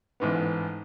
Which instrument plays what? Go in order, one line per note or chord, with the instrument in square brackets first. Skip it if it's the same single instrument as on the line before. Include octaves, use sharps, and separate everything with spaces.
[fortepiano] A1 G#2 B3